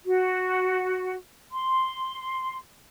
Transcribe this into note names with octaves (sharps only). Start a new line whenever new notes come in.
F#4
C6